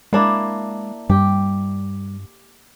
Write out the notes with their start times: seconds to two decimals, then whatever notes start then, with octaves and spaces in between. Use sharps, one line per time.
0.13 G#3 A#3 D4 E4
1.10 G2 G3 G4